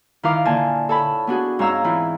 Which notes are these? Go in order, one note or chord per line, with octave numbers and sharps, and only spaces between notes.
D#3 E4 F4 A#4 F5 D6
A#2 D3 G#5 A5
A4 C#5 A5 B5
B3 D4 F#4 G#4
G#2 C4 C#5 F5 A#5 E6
E3 C4 E4 F4